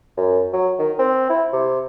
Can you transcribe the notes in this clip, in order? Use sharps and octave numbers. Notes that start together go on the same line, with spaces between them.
F#2
F#3
D#3
C4
E4
C3